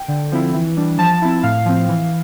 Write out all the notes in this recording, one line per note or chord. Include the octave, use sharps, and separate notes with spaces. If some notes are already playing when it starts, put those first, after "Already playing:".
Already playing: G5
D3
F3 C4 E4
E3
G3 D4
F3 A5
C4 E4
A2 F5
F3 C4
E3